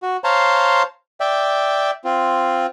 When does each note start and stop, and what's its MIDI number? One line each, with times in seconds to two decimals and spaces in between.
0.03 0.17 66
0.24 0.83 72
0.24 0.83 73
0.24 0.83 77
0.24 0.83 81
0.24 0.83 82
0.24 0.83 84
1.20 1.91 74
1.20 1.91 76
1.20 1.91 79
2.05 2.66 60
2.05 2.66 65